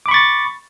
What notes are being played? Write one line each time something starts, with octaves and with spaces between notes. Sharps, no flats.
B5 C#6 D6 A6